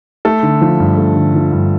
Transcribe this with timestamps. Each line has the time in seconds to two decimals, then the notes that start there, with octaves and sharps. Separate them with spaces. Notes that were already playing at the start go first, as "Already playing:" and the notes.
0.25 A3 A4
0.43 D3
0.61 F3
0.80 G2
0.98 A3
1.16 D3
1.35 F3
1.52 G2